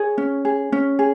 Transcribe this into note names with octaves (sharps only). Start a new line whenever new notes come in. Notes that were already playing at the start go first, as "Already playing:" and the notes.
Already playing: G#4 C#5
C#4
G#4
C#4
G#4